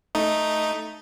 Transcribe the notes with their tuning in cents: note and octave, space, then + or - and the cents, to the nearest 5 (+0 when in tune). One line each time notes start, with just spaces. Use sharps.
A3 +0 D#4 +0